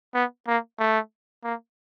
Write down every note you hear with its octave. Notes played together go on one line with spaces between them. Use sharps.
B3
A#3
A3
A#3